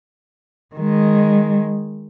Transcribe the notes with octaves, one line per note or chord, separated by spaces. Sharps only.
D#3 G#3